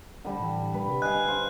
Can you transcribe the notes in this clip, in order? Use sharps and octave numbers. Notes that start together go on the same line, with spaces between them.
D3 G3
A2 E3
G3 B4
C3 G4
D#5 F5 G#5 F#6
C5 F5